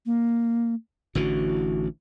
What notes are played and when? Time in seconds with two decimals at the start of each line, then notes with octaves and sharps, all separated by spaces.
0.06 A#3
1.15 A1 D3 E3 F#4